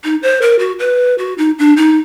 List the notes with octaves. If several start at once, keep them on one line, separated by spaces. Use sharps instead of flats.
D#4
C5
A#4
F#4
B4
F#4
D#4
D4
D#4